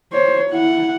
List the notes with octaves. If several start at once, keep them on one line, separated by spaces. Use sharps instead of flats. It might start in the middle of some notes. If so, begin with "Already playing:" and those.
C5 C#5
E4 F#5